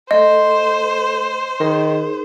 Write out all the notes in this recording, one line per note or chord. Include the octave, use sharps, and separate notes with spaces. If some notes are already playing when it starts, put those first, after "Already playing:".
A3 A4 C5 D#5
D#3 D#4 G#4 A#4